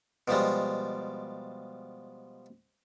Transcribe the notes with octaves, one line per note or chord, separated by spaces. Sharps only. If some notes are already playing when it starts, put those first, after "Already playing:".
B2 F3 G3 G#3